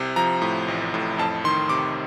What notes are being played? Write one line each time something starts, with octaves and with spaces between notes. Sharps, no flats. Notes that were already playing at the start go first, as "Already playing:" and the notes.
Already playing: C2 C3
F3 A#5
A2
A1
A2
F2 A5
D#3 C6
C3 D6